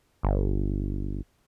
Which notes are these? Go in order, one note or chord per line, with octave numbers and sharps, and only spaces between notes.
G1